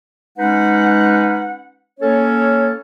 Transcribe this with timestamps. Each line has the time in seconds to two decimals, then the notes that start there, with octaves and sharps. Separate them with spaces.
0.37 G#3 C#4 D#4 B4 F#5
1.99 A#3 C#4 A4 C#5